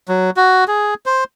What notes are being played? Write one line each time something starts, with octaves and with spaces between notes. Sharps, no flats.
F#3
F#4
G#4
C5